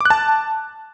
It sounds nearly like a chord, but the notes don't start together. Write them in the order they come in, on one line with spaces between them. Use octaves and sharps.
D6 F#6 A5